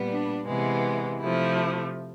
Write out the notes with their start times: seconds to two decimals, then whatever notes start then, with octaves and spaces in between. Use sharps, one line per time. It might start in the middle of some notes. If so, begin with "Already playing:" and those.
Already playing: A#2 G3 B3
0.09 D4
0.47 C3 E3 G#3 B3
1.21 C3 F3 A3 E4